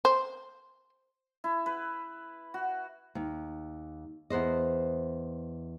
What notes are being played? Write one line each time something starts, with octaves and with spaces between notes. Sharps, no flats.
C5
E4
B4
F#4
D#2
E2 B4 C5 D#5